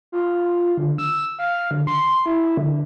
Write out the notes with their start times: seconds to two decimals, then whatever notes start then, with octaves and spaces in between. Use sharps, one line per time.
0.12 F4
0.78 D3
0.98 E6
1.39 F5
1.71 D3
1.87 C6
2.26 E4
2.57 D3